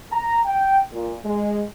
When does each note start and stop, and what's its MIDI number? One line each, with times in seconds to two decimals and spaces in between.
0.12 0.39 82
0.45 0.79 79
0.93 1.15 46
1.25 1.62 56